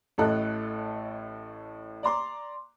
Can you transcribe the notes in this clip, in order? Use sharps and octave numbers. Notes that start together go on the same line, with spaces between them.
A1 A2 A4 D#5 F#6
D5 A#5 C6 D6